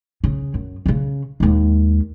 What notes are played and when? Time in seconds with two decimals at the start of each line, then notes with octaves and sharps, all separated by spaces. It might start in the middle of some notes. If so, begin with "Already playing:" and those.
0.24 C#3
0.54 F#2
0.86 C#3 C#4
1.40 D#2 G#3